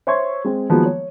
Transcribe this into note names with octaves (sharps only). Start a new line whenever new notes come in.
C5 C#5 E5 C6 C#6 G#6
G#3 C4
D#3 F3 F#3 G#3 A#3 B3
C#5